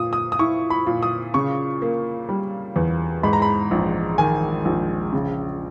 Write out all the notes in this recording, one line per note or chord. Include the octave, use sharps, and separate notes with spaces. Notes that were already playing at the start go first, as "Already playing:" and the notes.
Already playing: A#2 D#6
D#6
D#6
E4 C#6
B5
A#2
D#6
C#3 C#6
A#3
G3
E2
G#2 B5
A#5
B5
A#1
D#3 G#5
A#1
C#3